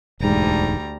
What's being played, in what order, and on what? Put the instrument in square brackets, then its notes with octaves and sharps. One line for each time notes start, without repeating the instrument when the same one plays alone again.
[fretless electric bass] E1 G#2 [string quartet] D2 G3 A#5